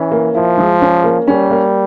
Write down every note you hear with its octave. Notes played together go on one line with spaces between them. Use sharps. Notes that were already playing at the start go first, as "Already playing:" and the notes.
Already playing: E3 C#4
A#3
F3 E4
G#3
C#4
A#3
G3 C#4
A#3